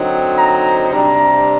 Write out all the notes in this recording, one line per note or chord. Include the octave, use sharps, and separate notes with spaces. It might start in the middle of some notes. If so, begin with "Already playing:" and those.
Already playing: D3 F#3 C4 D#4
A#5
C3 G3 D4 A#5